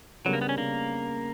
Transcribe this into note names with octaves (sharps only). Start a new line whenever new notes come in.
C#3 F#3 G3 B3 D4 A#4
A#3
B3
C#4
C#3 A#3